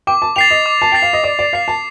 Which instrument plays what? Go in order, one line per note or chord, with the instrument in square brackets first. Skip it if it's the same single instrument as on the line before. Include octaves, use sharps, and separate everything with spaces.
[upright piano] G5 [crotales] D6
[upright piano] A5
[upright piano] G5 [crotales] A6 C7 F7
[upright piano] D#5
[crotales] D6
[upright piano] A5
[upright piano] G5 [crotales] A6 C7 F7
[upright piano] F5
D#5
[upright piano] D5 [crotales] D6
[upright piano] D5
[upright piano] F5 [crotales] A6 C7 F7
[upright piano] A5